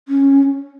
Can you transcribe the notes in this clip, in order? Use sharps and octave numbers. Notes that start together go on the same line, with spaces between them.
C#4